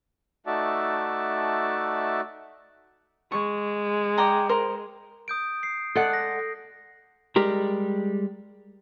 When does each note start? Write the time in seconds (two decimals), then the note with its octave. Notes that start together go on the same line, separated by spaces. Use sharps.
0.46 A3 D#4 F#4 D5 E5 A5
3.32 G#3 C#6
4.18 D5 G5 A#5
4.49 A#4 C5
5.28 D#6 G6 D7
5.63 C7
5.95 G#3 A4 D5 F#5
6.13 A#6
7.36 G3 G#3 G4 A#4